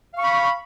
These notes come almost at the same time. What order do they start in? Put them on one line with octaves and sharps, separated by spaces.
F5 C#6 B5